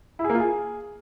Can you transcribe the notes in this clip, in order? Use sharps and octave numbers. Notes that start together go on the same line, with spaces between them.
E4
G#4
A#3
F4
G#4